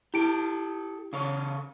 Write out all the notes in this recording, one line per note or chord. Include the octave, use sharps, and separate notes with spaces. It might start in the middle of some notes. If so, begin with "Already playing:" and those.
E4 G4 A4 D7
C#3 A4 C#5